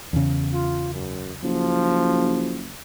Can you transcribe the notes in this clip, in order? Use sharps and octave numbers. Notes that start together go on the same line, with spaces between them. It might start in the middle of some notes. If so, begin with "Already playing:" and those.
E2 C#3
F4
F#2
F#1 F3